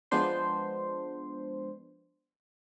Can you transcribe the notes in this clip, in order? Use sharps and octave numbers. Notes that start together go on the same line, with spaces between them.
F3 G#3 B3 D4 C5 C6